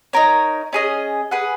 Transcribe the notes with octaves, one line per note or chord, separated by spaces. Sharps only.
D#4 A#4 C#5
C#4 G#4 D#5
G#4 B4 F#5